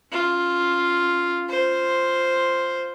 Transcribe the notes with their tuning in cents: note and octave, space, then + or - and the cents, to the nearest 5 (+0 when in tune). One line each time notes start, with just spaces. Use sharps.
C#4 +0 F4 +0
F4 +0 C5 +0